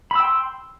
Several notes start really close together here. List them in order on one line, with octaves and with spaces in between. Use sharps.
B5 E6 G5 C6